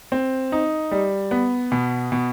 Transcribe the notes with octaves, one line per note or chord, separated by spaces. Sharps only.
C4
D#4
G3
B3
B2
B2